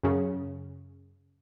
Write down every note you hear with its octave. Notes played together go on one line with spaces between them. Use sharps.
F#2 C#3